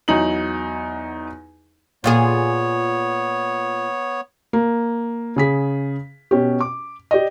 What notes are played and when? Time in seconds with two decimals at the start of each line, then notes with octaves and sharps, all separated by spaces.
0.08 E2 F#3 D#4 F#7
2.04 A#2 B3 F4 G#4 C#5
4.53 A#3
5.36 C#3 G#4 B6
6.31 B2 C#4 G4
6.61 D6
7.11 G4 D5 D#5